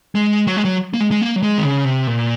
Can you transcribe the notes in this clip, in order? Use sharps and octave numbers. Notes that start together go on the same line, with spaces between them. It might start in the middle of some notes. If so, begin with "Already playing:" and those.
G#3
F#3
G#3
F#3
A#3
G#3
G#3
A#3
F#3
G#3
D#3
C#3
C3
A#2